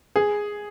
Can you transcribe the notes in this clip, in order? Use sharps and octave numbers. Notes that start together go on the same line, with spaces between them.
G#4